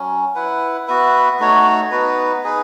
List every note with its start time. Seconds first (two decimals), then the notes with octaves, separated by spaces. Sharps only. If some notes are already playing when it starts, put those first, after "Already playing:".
Already playing: F#3 C#4
0.35 E4 B4 F#5
0.88 B3 F#4 B4 E5
1.40 A3 D#4 F#4 C#5
1.91 B3 D#4 F#4 B4
2.44 D#4 G#4 B4